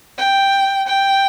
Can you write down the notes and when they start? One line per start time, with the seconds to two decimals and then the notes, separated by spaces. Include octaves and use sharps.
0.18 G5
0.87 G5